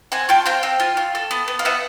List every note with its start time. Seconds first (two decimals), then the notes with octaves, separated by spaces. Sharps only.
0.12 C4 F#5 G#5
0.29 F4 G5 A5
0.46 C4 F5 G5
0.63 C4
0.80 F4
0.97 F4
1.15 A4
1.31 B3
1.48 B3
1.59 F5
1.65 B3 E5 F#5